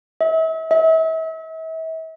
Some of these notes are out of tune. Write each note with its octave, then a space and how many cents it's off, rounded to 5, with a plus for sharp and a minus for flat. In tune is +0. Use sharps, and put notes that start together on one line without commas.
E5 -40
E5 -40